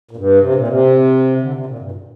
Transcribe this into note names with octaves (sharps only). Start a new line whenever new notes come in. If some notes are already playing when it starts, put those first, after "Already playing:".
A#2
G2
C3
A#2
C3
D3
C3
A#2
G2
A#2